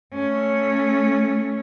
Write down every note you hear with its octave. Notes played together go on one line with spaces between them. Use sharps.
A3 C#4